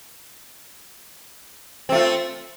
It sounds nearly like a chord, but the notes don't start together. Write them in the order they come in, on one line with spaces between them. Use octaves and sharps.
C4 A3 F4